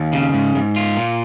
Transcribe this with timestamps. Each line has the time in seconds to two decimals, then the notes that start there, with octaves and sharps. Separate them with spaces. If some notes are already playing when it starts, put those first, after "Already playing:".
Already playing: D#2
0.13 C#3
0.34 G#2
0.55 G#2
0.76 F4
0.97 A#2